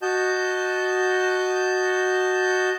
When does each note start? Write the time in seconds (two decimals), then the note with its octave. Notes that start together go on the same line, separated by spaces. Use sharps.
0.02 F#4 D#5 A5 G6